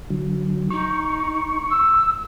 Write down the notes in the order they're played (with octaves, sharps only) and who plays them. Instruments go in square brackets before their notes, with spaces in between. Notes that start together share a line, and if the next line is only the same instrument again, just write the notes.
[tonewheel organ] D3 F#3
[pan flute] D#4 [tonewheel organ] C#6
[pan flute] E6